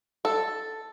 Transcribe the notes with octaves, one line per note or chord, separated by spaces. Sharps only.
A4